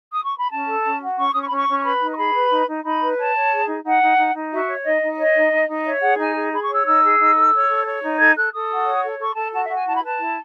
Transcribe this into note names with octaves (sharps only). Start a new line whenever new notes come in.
D#6
C#6
B5
C#4 A5
A4
C#4
F#4
C#4 C#6
C#4 D#6
C#6
C#4 B5
C#6
C#4
C#6
B4 B5
D#4
C#6
G#4 B5
B4
D#4
D#4
D#4 B5
B4
C#5 A5
C#5
G#4
D#4
D#4 F#5
D#4
D#4
D#4
F#4 E5
C#5
D#4 D#5
D#4
C#5 D#5
D#4
D#4
D#4
C#5 E5
G#4 F#5
D#4 G#5
G#4
G#4 B5
C#6
C#5 E6
D#4 E6
G#4
D#4
A4
C#5
A4
C#5
D#4
A4 G#6
A4 F#6
A4 D#6
F#4
C#5
A4
A4 C#6
A4 A5
F#4 A5
E5
F#4
G#5
E4 A5
B5
B4 A5
E4